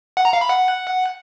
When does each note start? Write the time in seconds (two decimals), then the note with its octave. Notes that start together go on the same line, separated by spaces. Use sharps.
0.17 F#5
0.25 A#5
0.33 F5
0.41 B5
0.49 F#5